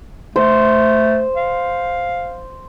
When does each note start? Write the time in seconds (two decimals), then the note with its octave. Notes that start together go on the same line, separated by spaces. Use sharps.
0.36 A3 C5
1.37 F5